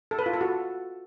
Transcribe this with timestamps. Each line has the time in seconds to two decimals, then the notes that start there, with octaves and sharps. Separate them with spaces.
0.11 A4
0.19 B4
0.26 F4
0.33 A4
0.41 F#4